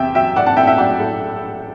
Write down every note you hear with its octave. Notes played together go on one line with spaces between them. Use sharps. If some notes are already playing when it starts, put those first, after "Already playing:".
Already playing: E2 C3 E5 G5
F#3 E5 G5
A2 D5 F#5
F#5 A5
A2 E5 G5
E5 G5
F#3 D5 F#5
A2 A4